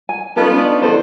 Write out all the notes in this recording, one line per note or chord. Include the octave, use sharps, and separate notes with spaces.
G#5
B3 C#4 D#4 F4 A4
C#4 D4 D5
E2 D3 A4 C5